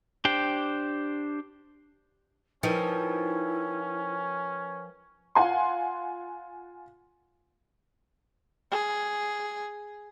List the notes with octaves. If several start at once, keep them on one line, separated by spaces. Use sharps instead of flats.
D4 G4 C5 G5
F3 C#4 D#4 E4 A#4 B4 G5
F4 F#5 G#5 C6
G#4